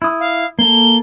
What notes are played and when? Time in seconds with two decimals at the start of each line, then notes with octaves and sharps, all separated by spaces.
0.02 E4 D#6
0.19 F5
0.59 A#3 A4 G7